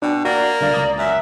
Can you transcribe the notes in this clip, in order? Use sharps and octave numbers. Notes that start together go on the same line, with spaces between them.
B2 D4 G5
A#3 F#4 D5
C2 D3 D5 F5
C#2 A#5 D#6
F#2 E5